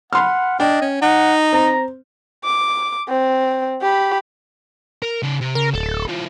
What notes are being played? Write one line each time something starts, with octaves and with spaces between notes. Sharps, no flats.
F#5 B5 C6 F6
D4 D#5 G5
C#4
D#4 F#5
C4 A#5
D6
C4
G4 B5
A#4
C#3 D5
C3
C#3 A#4
D1 A4
E3 F4